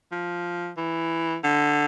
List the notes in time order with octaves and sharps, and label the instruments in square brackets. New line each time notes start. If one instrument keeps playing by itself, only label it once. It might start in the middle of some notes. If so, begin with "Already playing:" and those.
[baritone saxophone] F3
E3
D3